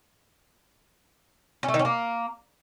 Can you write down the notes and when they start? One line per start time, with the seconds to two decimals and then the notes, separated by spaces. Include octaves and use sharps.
1.63 C#4
1.68 A3
1.74 D#3
1.79 C#4
1.85 A#3